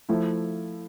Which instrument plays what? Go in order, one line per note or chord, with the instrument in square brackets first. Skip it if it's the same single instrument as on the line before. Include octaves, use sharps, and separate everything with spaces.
[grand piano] F3 A3 E4